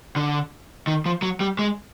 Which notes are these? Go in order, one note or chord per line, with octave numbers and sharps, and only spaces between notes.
D3
D#3
F3
F#3
G3
G#3